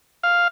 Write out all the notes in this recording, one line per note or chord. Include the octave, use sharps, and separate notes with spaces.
F5